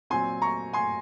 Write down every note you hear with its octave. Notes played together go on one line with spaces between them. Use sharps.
A#2 F#3 C4 G#5 C6
A#5 C#6
G#5 C6